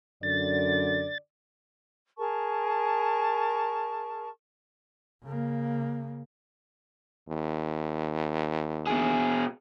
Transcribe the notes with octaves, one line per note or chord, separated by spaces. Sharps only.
F#2 D3 D5 A6
G#4 A#4 A5 C#6
C#3 A#3
D#2
B2 G#4